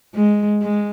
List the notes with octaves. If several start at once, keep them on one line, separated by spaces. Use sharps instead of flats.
G#3
G#3